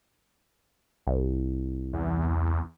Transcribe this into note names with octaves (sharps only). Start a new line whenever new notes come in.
C2
E2